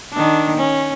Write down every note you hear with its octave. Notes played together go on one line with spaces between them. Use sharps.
D#3 D4
C#4